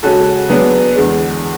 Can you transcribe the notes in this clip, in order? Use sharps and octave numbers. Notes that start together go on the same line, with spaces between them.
C#3 G#3 C#4 F#4 A4
F#3 B3 D4 G#4
E2 D3 G#3